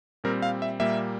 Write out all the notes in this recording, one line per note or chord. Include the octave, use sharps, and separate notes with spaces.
A#2 G3 C4 A#4
F5
E5
A#2 G3 A#3 E5